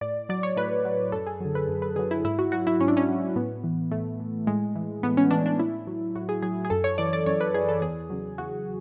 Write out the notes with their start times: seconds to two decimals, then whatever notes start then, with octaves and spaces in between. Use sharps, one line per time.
0.01 A2 D5
0.29 F#3 D5
0.43 C#5
0.57 A2 B4
0.85 F#3
1.12 F#2 A4
1.27 G#4
1.41 D3 F#3
1.55 B4
1.68 F#2
1.82 B4
1.96 D3 F#3 G#4
2.11 E4
2.24 G#2 E4
2.39 F#4
2.52 F#3 F#4
2.67 E4
2.80 G#2 C#4
2.88 D4
2.97 C#4
3.08 F#3
3.36 A2 B3
3.64 E3
3.91 A2 A3
4.20 E3
4.47 A2 G#3
4.75 E3
5.03 A2 B3
5.17 C#4
5.31 E3 D4
5.46 D4
5.59 A2 E4
5.87 F#3
6.15 A2 F#4
6.29 G#4
6.42 F#3 G#4
6.65 G#4
6.70 F#2 A4
6.84 C#5
6.98 E3 D5
7.13 D5
7.26 F#2 C#5
7.41 B4
7.54 E3 G#4
7.69 A4
7.82 E2 G#4
8.10 C#3 F#3
8.38 E2 F#4